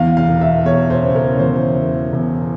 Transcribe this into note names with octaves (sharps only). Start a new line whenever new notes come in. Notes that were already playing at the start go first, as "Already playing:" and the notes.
Already playing: E2 F5
F5
E1
E5
E1 C#5
C5
C#3
A#4
C#5
E2 C5
E1
E1